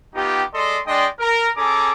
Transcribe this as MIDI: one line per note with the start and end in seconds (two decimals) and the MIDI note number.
0.15 0.43 59
0.15 0.43 63
0.15 0.43 65
0.15 0.43 67
0.54 0.79 56
0.54 0.79 69
0.54 0.79 74
0.54 0.79 75
0.54 0.79 84
0.86 1.06 56
0.86 1.06 62
0.86 1.06 74
0.86 1.06 75
0.86 1.06 79
0.86 1.06 84
1.19 1.49 70
1.56 1.93 61
1.56 1.93 68
1.56 1.93 69
1.56 1.93 82
1.56 1.93 86